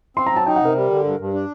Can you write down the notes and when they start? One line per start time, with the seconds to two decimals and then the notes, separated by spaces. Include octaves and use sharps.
0.17 C4 C6
0.26 A#5
0.31 F#3
0.36 A5
0.46 D#4 G5
0.56 F#5
0.61 C3 A#4
0.75 G3
0.90 D3
1.04 G2
1.19 G2
1.34 D4